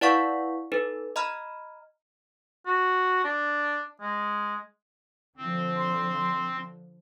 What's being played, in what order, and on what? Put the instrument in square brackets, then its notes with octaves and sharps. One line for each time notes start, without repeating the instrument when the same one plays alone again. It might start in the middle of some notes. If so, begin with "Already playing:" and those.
[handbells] E4 B4 D5 F5 F#5 C#6
D#4 A4 B4
D#5 A#5 B5 F6
[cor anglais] F#4
D4
G#3
[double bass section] D3 F3 [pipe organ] C4
[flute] C6